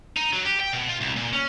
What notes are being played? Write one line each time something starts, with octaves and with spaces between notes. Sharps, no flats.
D#4
F#3
G4
G5
B2
F4
C2
A#2
C#4